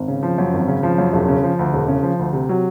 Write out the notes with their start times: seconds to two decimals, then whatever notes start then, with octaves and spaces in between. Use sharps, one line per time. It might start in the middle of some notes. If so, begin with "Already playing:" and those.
Already playing: G#1
0.08 C#3
0.23 F3
0.38 F#2
0.53 G#1
0.68 C#3
0.83 F3
0.98 F#2
1.13 E1
1.28 C#3
1.43 F3
1.59 D2
1.73 E1
1.88 C#3
2.03 F3
2.19 D2
2.33 C3
2.49 F#3